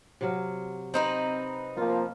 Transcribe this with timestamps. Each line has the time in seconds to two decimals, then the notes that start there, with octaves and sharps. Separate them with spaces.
0.21 C3 F#3 F5
0.94 C4 D#4 B4 C5
1.77 F3 A#3 F4